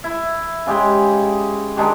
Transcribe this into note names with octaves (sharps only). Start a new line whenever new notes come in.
E4
C#3 G#3 G4
D#3 G#3 D4 G4